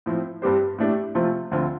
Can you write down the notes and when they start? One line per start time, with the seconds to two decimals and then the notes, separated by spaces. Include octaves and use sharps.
0.06 A2 F3 C4
0.42 G2 G3 C4 G4 C5
0.78 A2 A3 D4 G4
1.15 C3 F3 A3 C4 F4
1.51 D2 D3 F3 C4 F4